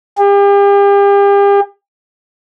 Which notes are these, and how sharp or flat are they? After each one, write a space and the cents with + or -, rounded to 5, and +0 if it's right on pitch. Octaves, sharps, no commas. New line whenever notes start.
G4 +40